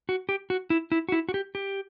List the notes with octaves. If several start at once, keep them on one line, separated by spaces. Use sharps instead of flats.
F#4
G4
F#4
E4
E4
F#4
E4
F#4
G4
G4